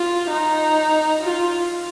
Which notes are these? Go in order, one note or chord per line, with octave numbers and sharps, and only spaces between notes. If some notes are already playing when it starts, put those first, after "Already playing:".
Already playing: F4
D#4
F4